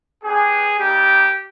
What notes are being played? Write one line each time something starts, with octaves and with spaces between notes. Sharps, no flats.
B3 D4 G4 G#4
G3 A#3 D#4 G4